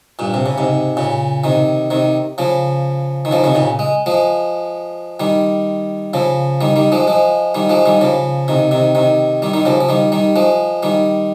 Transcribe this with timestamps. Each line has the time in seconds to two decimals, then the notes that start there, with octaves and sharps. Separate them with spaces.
0.19 G2 A#2
0.34 C3
0.46 C#3
0.58 G#2 C3
0.97 A#2 C#3
1.44 C3 D#3
1.90 C3 D#3
2.38 C#3 F3
3.25 D#3
3.31 C#3 F3
3.44 C3 D#3
3.55 A#2 C#3
3.79 G#3
4.06 F3 G#3
5.20 D#3 G3
6.13 C#3 F3
6.61 D#3 G3
6.76 D#3 G3
6.92 F3 G#3
7.07 F3 G#3
7.54 D#3 G3
7.70 F3 G#3
7.86 D#3 G3
8.01 C#3 F3
8.48 C3 D#3
8.71 C3 D#3
8.95 C3 D#3
9.42 D#3 G3
9.53 D#3 G3
9.65 C#3 F3
9.81 F3
9.89 D#3 G3
10.12 D#3 G3
10.36 F3 G#3
10.83 D#3 G3